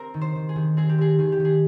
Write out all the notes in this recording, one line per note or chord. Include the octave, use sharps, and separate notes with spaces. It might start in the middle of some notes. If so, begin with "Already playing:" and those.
Already playing: C4 A#4
D#3
C5
D#3
G#4
D#3
C4 G#4
G4
C4 G#4
D#3 G#4
G4
D#3 G#4